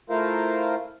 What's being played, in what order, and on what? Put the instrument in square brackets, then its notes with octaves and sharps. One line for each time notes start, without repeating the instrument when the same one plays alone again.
[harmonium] A3 E4 F4 A#4 C5 F5